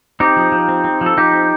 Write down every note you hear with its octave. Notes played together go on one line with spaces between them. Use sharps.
C4 D#4 G4
F3
F3
C4
C4
F3
A4
F3 D#4 G4
C4